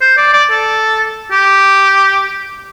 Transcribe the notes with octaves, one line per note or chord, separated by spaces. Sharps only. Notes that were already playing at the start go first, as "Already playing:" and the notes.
C5
D5
D5
A4
G4